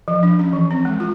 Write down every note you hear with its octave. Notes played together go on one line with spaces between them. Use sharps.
F3
D4
C#4
E3
C4
G#3
F4